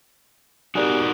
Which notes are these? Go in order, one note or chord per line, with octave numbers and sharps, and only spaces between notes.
D#4 F#4 G4 A#4 D5 G#5